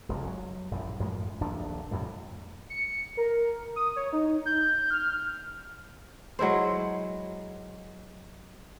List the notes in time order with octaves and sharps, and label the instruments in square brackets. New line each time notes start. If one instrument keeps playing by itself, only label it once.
[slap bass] F1 C#2 F#2
F#3
A#1 F#2 A2 G3
F#2 A2 F3 G#3
D#1 A#1 D4
F2 A2 C3 G3
[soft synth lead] C#7
A#4
D#6
C#5
D#4
G6
F6
[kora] F#3 G#3 E4 C5